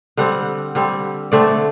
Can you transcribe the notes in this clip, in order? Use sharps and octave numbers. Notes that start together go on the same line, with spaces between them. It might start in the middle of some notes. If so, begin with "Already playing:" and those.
D3 G3 C4 F#5
D3 G3 C4
D3 A3 C4 D5